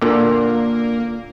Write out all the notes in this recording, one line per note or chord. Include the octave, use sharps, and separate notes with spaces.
A#2 D3 A#3